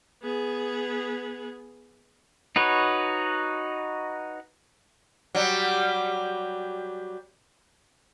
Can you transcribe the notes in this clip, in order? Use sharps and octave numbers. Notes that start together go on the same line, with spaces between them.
B3 G#4
D#4 F#4 B4 C#5
F#3 G3